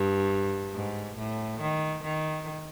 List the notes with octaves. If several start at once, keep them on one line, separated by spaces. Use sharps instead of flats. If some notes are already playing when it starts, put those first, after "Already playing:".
Already playing: G2
G#2
A2
D#3
D#3